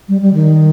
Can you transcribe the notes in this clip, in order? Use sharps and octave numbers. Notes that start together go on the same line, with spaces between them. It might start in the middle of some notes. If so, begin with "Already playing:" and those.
G3
G3
D#3